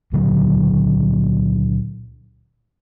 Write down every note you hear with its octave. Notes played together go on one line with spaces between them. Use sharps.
C#2 A#2 D3 F#3